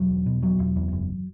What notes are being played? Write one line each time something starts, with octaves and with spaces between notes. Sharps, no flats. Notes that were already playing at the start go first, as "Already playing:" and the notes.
Already playing: E1 F#3
E2
B2
E1 F#3
E1
E2
F#1